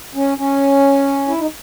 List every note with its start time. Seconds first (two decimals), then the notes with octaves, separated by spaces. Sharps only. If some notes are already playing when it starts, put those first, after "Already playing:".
0.15 C#4
0.38 C#4
1.28 E4
1.39 D#4